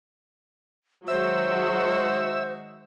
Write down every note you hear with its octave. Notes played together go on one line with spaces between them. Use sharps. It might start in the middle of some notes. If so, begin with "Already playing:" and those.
D#3 F#3 G#3 F#4 C5 E5 E6